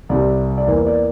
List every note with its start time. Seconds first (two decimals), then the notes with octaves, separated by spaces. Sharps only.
0.09 C2 C3 G3 D5
0.58 D5
0.67 E2 E3 A#3 C5
0.87 D5